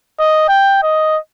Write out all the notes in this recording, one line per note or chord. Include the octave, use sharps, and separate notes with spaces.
D#5
G5
D#5